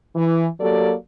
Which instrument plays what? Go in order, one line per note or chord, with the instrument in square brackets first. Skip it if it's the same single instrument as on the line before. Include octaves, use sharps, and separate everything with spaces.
[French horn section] E3
F#3 A#3 G4 A4 D5